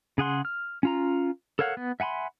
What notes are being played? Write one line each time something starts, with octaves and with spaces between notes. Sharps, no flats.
C#3 G#4 F#5 C6
F6
C#4 F4 A#5
A4 A#4 C#5 F5 F#5
B3
E5 F#5 G#5 B5 C6